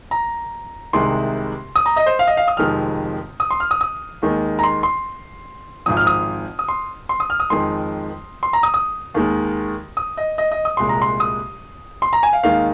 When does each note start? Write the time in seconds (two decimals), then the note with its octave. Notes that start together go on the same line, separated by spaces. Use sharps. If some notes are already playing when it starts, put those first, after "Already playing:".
0.11 A#5
0.93 C2 C3 D#3 G#3 C6
1.76 D#6
1.86 A#5
1.96 D#5
2.06 C5
2.19 F5
2.27 D#5
2.37 F5
2.48 D#6
2.57 F1 F2 D#3 G#3 F6
3.40 D#6
3.50 C6
3.60 F6
3.71 D#6
3.81 D#6
4.22 D#2 D#3 G#3
4.59 A#5
4.63 C6
4.83 C6
5.86 G#1 G#2 F3 D#6
5.97 F6
6.07 D#6
6.59 D#6
6.68 C6
7.09 C6
7.20 D#6
7.30 F6
7.40 D#6
7.50 F2 D#3 G#3 C6
8.43 C6
8.53 A#5
8.63 D#6
8.74 D#6
9.14 D#2 D#3 G#3
9.97 D#6
10.17 D#5
10.38 D#5
10.52 D#5
10.65 D#6
10.77 C2 A#2 G#3 C6
10.89 A#5
11.02 C6
11.20 D#6
12.02 C6
12.13 A#5
12.23 G#5
12.33 F5
12.43 D#2 D#3 G#3 F5